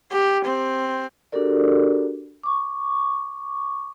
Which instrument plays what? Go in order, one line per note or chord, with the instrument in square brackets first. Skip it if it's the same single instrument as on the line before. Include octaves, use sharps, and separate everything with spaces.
[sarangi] G4
C4
[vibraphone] D4 F#4 G4 A4 A#4 D5
C#6 D6